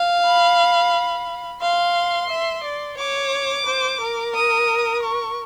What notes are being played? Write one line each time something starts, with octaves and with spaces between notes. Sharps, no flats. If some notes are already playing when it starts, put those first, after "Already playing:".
Already playing: F5
B5
F5 C6
E5
D5
C#5 D6
C5
A#4
D#6
C#6